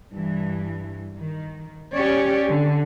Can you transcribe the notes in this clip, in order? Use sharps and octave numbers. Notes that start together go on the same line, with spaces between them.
G2 E3
D#3
C#4 G4 C#5 D5
D3